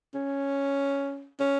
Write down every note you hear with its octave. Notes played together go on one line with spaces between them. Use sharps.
C#4
C#4